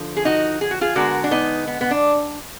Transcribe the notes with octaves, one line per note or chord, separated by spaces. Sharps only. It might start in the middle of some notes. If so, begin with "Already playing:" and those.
Already playing: D3 F3
G#4
D#4 F#4
G#4
F#4
F4 G#4
D3 G#3 B3 F#4 A#4
D4
B3 D#4
B3
B3
D4